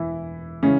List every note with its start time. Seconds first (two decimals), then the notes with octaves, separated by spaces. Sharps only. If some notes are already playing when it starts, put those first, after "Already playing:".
Already playing: E1 E3 E4
0.63 C#3 E3 G#3 C#4